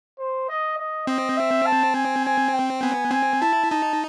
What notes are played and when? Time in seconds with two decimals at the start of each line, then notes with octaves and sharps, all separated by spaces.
0.19 C5
0.49 D#5
0.78 D#5
1.07 C4 D#5
1.37 E5
1.66 A5
1.95 G#5
2.25 G#5
2.53 G5
2.82 B3 G#5
3.12 C4 G#5
3.41 E4 A5
3.71 D#4 A5